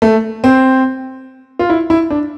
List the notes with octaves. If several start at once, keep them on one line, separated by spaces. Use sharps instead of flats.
A3
C4
F4
E4
E4
D4